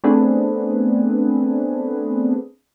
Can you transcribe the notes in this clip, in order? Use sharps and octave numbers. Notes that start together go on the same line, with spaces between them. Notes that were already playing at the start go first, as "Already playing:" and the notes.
A3 B3 C4 D4 G#4 B4